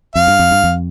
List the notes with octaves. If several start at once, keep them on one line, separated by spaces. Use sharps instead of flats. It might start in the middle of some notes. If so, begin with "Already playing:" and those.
F2 F5
G2
F2
G2
F2